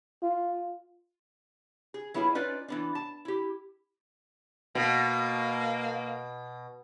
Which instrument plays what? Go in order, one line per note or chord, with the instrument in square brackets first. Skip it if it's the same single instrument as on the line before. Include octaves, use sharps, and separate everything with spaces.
[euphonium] F4
[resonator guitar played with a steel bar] G#4
F#3 B3 E4 F4 G#4
C#4 D#4 F4 B4 D5
E3 B3 D4
A5
E4 G4
[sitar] B2 [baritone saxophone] A#3